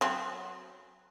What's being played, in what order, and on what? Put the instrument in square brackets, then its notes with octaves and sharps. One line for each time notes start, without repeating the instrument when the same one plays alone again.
[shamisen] F#3 C4